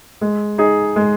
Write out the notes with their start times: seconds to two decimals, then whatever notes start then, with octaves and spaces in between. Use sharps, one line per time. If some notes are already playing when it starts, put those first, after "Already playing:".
0.21 G#3
0.58 D#4 G#4
0.96 G#3